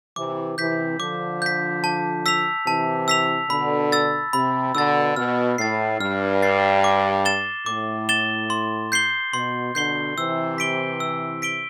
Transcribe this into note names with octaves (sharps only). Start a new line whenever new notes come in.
C3 E3 D6
C3 E3 G6 B6
D3 F3 D6
G6 B6
A5
E6 B6 F7
C3 E3 A5
E6 B6 F7
B2 D3 B5
E6 A6
C3 B5
B2 D3 E6 A6
B2 F6
A2 A6 C7
G2 F6
A6 C7
D6
A6 E7 G7
A2 D6
A6 E7 G7
C6
G6 C7 G7
B2 C6
B2 D3 G6 C7 G7
C3 E3 E6
B6 D7 G7
E6
B6 D7 G7